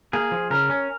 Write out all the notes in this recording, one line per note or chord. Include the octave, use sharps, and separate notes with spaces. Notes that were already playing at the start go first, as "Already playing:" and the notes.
A#3 G#4
F3
C#3 A#4
C#4